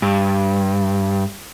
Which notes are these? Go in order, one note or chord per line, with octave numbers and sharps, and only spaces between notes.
G2